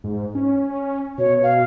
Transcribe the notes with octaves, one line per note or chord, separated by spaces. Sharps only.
G#2
C#4
B2 C#5
F5